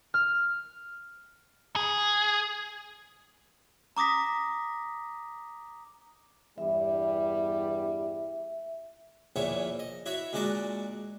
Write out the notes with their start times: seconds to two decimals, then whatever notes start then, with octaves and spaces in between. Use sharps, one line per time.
0.14 F6
1.76 G#4
3.97 A#5 D6 D#6 A#6 B6
6.58 E2 G2 G3 E5
9.36 A#1 E2 A#2 E4 C#5
9.79 D#5
10.06 E4 F#4 C#5 E5
10.33 A#2 G#3 D4 F#4 D5 A#5